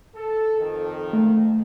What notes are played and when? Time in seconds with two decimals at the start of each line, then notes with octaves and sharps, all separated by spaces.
0.16 A4
0.60 F2 D#3
1.13 A3